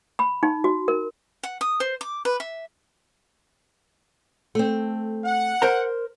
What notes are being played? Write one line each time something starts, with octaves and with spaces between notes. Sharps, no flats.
B5
D#4
F#4
A#4
F#5
D#6
C5
D6
B4
E5
A3 C4
F#5
A#4 C5 A#5